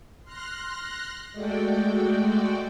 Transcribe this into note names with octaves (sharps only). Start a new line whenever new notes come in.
C6 F6 F#6 A#6
G#3 A3 F#4 D5 G5